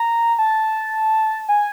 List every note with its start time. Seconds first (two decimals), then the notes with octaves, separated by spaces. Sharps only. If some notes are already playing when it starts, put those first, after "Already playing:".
Already playing: A#5
0.39 A5
1.49 G#5